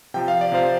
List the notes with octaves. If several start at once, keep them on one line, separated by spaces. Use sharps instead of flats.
C3 F3 G5
F5
D5
C3 F3 C5 F5